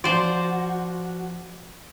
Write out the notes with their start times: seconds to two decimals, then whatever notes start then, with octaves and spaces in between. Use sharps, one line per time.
0.04 F3 F#4 C5 D5 C6